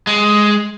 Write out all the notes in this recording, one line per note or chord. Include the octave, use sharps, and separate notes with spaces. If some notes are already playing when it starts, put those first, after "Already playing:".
G#3